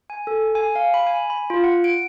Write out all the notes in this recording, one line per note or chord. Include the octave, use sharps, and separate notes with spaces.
G#5
A4
G#5
F5
B5
G#5
B5
F4
F#5
D7